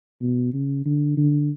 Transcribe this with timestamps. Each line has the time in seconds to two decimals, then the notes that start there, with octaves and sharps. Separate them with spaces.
0.21 B2
0.53 C#3
0.85 D3
1.17 D3